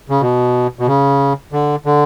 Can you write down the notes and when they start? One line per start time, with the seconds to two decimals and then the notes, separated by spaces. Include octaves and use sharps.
0.10 C#3
0.21 B2
0.79 B2
0.87 C#3
1.52 D3
1.86 D3